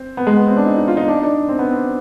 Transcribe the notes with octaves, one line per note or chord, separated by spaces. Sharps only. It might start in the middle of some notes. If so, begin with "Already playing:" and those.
Already playing: C4
B3
G#3
B3
C4
D4
D#4
D#4
F4
D#4
D4
D#4
D4
C4
B3
C4